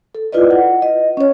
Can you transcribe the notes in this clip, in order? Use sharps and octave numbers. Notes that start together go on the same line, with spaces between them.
A4
E4 F4 B4 D5 D#5
F#5
D#5
C#4 C#5